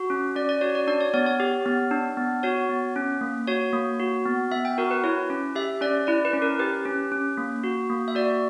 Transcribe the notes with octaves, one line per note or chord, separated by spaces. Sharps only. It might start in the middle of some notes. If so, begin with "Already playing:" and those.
Already playing: F#4
C#4
C#4 D5
D5
F#4 C#5
D5
D4 D5
C#5
B3 C#5
C#5
G4
B3
D4
B3
F#4 C#5
B3
C#4
A#3
F#4 C#5
A#3
F#4
B3
B3 E5
G5
F#4 A#4
B4
E4 C#5
C#4
G4 E5
C#4 D5
E4 D5
B4
C#4
A#4
G4 B4
C#4
C#4
A#3
F#4
A#3
E5
F#4 D5